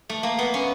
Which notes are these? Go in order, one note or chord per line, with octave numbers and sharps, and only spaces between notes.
A3
A#3
B3
C#4